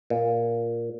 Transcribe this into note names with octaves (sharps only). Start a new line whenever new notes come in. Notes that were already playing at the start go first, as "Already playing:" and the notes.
A#2